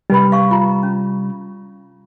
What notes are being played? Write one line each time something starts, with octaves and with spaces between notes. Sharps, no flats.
C3 G3 D#4 B4 B5
F5 C#6
F4 A#5
C#4